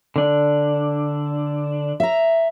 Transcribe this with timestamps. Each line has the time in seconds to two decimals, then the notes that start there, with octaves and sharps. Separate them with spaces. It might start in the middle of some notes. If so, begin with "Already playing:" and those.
0.16 D3 D4
2.00 E5 A#5